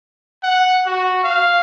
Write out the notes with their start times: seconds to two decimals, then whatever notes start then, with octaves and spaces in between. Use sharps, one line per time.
0.43 F#5
0.86 F#4
1.24 F5